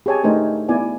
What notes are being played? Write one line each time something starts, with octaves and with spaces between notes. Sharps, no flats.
G4 G#4 C#5 G#5 A5
A3 D4 D#4 A#4 C5
B3 E4 D5 G#5